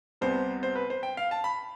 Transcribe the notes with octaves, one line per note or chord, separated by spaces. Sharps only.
C2 C3 G3 B3 C5
C5
B4
C5
G5
F5
A5
B5